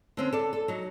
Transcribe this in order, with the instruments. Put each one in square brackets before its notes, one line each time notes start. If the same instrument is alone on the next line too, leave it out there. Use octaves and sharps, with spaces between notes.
[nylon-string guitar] D3 C4 C#4
A4 D5
A4
F#3 D#4